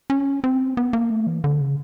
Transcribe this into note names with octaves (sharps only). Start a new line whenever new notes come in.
C#4
C4
B3
A#3
A3
E3
D3
C#3